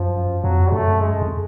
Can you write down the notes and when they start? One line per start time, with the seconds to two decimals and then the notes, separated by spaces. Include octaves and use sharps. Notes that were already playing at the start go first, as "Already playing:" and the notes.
Already playing: F#2 F3
0.43 F2 F#3
0.72 F#2 A3
1.00 G#3
1.22 F2